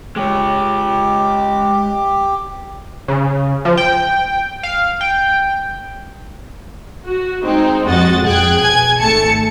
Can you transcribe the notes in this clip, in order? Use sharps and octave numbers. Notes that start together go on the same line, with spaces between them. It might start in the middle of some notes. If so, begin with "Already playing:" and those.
G#3 G4 C#5
C#3
F3
G5
F5
G5
F#4
G#3 C4 D#4
F2 G#3 F#4 D#5 F#5 A6
F2 G#4 G5 F#6 G#6
B2 G#5 G#6
G#1 A3 A5 C#7